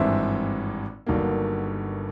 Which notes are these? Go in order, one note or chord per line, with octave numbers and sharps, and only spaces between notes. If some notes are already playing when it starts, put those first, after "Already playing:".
Already playing: G#1 G2 E3 G#3 C4 E5
G1 G2 D#3 F#3 A#3